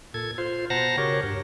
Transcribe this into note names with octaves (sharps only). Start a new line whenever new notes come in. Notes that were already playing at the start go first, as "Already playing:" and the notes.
A#2 A4 G#6
F4 C5
B2 C5 F#5 A5 A#5 A#6
C#3 F#4 G4 A#4 C#5
G2